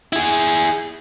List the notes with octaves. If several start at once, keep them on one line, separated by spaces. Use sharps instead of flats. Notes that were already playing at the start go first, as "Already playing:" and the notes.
E4 G#4